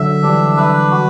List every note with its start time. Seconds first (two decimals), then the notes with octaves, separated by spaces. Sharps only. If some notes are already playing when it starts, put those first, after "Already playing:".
Already playing: D3 F#3 E5
0.23 E3 G3 D4
0.57 B4
0.91 F#4